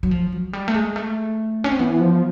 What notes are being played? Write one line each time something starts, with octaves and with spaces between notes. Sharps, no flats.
F#3
F3
F#3
G3
A3
G#3
A3
C#4
C4
E3 B3
F3